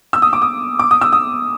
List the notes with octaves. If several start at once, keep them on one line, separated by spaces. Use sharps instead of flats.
E6
D#6
D6
D#6
D6
D#6
E6
D#6